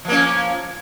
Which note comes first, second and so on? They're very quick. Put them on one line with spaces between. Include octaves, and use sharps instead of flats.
F3 A#3 C#4